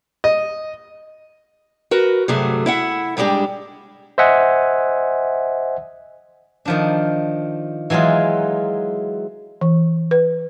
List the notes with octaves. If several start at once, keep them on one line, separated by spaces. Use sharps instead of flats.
D#5
F#4 A#4 B4
D2 G2 C3 F#3 A3 G#4
E4 E5 F#5
G#2 G3 G#3 D4 G4
C5 D#5 E5 F#5 G#5
D#3 F3 D4
E3 F#3 G#3 D#4 F4
E3
B4